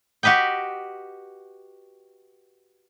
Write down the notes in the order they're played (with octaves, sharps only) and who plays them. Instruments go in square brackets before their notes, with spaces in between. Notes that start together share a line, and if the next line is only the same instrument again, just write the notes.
[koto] F#4 G4 B4 D#5 G5